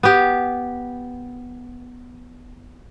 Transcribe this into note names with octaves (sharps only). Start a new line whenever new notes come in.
B3 G4